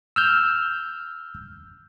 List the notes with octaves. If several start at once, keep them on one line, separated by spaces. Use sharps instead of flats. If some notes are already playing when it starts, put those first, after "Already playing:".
E6 F6 G6